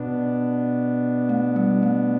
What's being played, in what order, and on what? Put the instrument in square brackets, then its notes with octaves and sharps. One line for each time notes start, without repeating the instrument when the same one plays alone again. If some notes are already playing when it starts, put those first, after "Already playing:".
Already playing: [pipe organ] B2 B3 D4
[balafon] A3
G3
A3